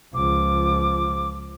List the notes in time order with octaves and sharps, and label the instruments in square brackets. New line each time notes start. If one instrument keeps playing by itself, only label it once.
[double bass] C#2 F3 [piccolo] D6